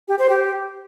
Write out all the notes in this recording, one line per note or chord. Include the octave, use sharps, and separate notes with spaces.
G4
C5
G4